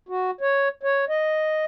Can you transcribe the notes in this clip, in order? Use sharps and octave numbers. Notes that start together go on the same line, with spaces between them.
F#4
C#5
C#5
D#5